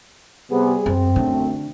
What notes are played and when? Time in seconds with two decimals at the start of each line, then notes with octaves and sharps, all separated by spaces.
0.51 C3 G3 B3 G#4
0.86 F#2 C4
1.16 F#2 D3 A3